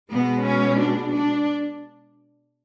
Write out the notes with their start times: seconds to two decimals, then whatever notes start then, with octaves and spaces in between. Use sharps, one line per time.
0.11 B2 G#3 B3
0.45 C#4
0.79 D4
1.13 D4